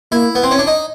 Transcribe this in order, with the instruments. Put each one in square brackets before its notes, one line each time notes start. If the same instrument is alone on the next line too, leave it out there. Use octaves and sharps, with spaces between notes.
[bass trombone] A#3 [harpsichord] E4
[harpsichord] B3
C4
C#4
D4
D#4